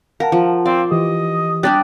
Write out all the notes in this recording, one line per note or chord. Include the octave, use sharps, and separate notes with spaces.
A#4 F5 F#5 A5
F3
C4 D5 F5
E3 G4 D#5
G3 D4 G4 D#6 F#6 A6